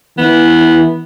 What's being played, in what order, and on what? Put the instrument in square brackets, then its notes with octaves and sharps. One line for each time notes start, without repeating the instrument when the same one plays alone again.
[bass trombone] E3 [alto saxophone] B3